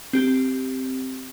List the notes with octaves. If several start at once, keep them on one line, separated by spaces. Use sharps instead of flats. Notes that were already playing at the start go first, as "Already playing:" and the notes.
C4 G4 G6